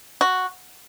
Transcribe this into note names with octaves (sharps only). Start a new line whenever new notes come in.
F#4